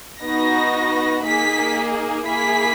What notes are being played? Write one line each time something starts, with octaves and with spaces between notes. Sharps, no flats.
B3 D#4 F#4 A#6
A#3 D#4 G#4 B6
A#3 E4 G#4 B6